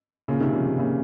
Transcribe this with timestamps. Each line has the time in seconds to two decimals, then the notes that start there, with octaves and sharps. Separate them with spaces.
0.28 A#2 C#3
0.40 C3 D#3
0.53 C#3 F3
0.65 C3
0.78 A#2 C#3